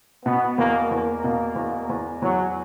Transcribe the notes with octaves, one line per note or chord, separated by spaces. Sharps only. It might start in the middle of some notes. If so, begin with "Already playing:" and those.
B2 B3
E2 A#3
E2 A#3
B2
E2
E2
E2 F#3